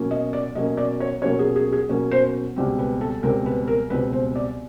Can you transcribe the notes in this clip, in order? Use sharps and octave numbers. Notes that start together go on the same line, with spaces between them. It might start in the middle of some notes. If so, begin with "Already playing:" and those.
Already playing: B2 F#3 A#3 C#4
D#5
D5
B2 F#3 A#3 C#4 D#5
D5
C#5
B2 F#3 A#3 C#4 C#5
G#4
G#4
G#4
B2 F#3 A#3 C#4
C5
C#2 B2 G3 C4
B4
A4
C#2 B2 G3 C4 A#4
B4
A#4
C#2 B2 G3 C4 B4
C5
D5